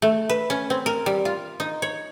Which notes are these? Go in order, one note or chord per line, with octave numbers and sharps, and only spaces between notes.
A3
B4
C#4
C4
A#4
G3
F4
D#4
C#5